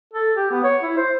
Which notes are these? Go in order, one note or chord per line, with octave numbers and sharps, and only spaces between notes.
A4
G4
B3
C#5
E4
C5